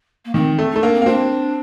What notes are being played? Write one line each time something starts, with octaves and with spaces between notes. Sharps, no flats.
A#3
D#3 C4
A3
A3 D#4
A#3 D4
C4
A#3
C4 D4